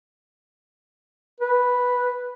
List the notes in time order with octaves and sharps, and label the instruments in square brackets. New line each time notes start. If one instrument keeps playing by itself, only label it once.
[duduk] B4